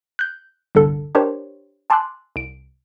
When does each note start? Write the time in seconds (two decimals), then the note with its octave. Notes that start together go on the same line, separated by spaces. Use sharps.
0.19 F#6 G6
0.75 G1 C2 D3 A4
1.15 D4 G4 A#4 C5 C#5
1.90 G#5 A5 C6 D6 E6 F#6
2.36 C2 D7